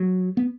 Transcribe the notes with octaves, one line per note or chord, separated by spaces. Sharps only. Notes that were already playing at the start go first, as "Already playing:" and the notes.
Already playing: F#3
B3